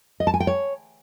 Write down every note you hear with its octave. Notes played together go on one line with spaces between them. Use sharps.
D#5
A5
G#5
G5
C#5